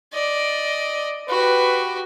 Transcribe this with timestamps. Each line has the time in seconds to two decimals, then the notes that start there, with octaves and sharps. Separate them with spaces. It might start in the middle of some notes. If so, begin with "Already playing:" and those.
0.13 D5 D#5
1.29 F#4 G4 B4